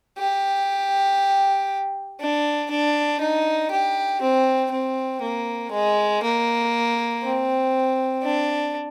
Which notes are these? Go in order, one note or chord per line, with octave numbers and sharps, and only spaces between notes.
G4
D4
D4
D#4
G4
C4
C4
A#3
G#3
A#3
C4
D4